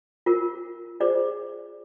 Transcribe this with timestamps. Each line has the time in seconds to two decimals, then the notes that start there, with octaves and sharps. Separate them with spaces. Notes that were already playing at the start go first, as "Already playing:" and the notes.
0.26 F4 A#4
1.00 F4 G#4 C5 D5